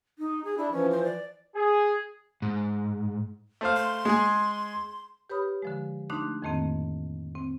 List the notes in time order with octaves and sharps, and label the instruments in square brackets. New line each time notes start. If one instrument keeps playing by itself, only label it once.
[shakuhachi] D#4
G#4
[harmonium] D4 [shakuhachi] E4
[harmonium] E3 F3 [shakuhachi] C#4
[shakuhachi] C5
D5
[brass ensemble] G#4
[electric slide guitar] G#2
[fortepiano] A3 C5 F5
[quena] C6
[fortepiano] G#3 G#4
[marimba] G4 B4 C#5 B5 D#6 F6
D3 F3 G#3
A3 D4 D#4 C6 D6 F#6
F2 A2 D#3 A3 A#3 C4
C4